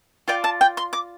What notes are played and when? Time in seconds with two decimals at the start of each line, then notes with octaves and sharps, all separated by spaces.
0.28 F4 D5 G5
0.44 A5
0.61 G5
0.77 C6
0.93 D6